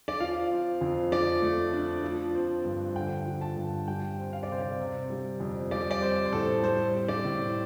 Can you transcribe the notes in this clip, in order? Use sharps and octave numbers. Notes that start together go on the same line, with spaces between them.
D5
F3 F5
C4
F2
F3 D5
A3
D4
F3
C4
G2
D3 G5
F3
A5
G2
G3 G5
C4
F5
D5
C3 C5
D5
C3
G3
F2
G3 D5
D5
C4 C5
C5
A2 A4
G3 C5
C4
D5
A2